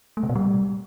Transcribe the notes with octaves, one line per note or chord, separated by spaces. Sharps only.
A3
C3
B2
G3